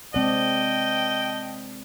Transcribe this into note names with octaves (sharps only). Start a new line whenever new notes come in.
G#3 C4 D5 D#5 G5 A5